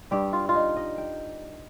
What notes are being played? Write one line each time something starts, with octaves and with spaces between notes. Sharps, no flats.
G2 G3 G4
F4
F4
D#4
D#5
G5